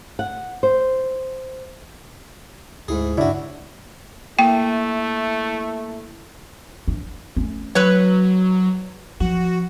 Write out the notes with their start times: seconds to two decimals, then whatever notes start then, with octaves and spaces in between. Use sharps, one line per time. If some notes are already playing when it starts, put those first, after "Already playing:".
0.19 F#5
0.63 C5
2.88 D2 G#2 E4 G#4
3.17 G2 C#3 C#4 D4 E4 F#4
4.39 A3 A#3 E4 G5
6.88 D4
7.36 A3 C#4
7.75 F#3 B4 C#5
9.20 F3 F#4